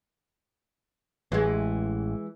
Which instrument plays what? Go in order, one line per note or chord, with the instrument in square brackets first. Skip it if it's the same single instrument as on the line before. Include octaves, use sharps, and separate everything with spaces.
[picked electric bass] A1 [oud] E3 G#3